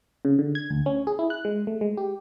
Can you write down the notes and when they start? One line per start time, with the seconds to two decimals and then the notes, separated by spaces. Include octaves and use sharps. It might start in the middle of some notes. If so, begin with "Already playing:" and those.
0.25 C#3
0.39 D3
0.55 G#6
0.70 D2
0.86 C#4
1.07 G#4
1.19 E4
1.30 F#6
1.45 G#3
1.67 A3
1.81 G#3
1.97 G4